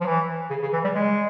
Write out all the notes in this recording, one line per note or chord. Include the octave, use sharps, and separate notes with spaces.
F3
E3
C#3
C#3
E3
G3
G#3